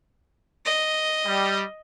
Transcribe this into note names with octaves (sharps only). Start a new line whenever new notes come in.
D#5
G3